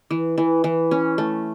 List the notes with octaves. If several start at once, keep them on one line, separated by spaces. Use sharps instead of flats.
E3
E3
E3
C#4
A3